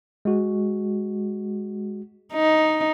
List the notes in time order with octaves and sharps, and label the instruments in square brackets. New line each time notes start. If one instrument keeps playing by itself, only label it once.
[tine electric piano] G#3 F#4
[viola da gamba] D#4